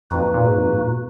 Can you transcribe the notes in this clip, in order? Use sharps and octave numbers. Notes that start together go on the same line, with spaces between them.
F2 A#3 D#4 F#4 B4
A#2
G#2
F2
G#2
A#2
B2